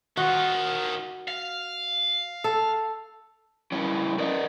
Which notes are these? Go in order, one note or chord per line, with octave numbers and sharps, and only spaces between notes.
D#3 F4 F#4
F5
A4
G3 C#4 E4 C#5
A#4 D5 D#5